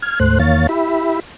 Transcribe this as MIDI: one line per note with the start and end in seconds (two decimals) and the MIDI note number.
0.02 0.19 89
0.02 0.19 92
0.20 0.39 38
0.20 0.39 44
0.20 0.39 57
0.20 0.39 72
0.20 0.39 90
0.39 0.67 40
0.39 0.67 51
0.39 0.67 58
0.39 0.67 73
0.39 0.67 77
0.39 0.67 93
0.69 1.20 64
0.69 1.20 67
0.69 1.20 76
0.69 1.20 83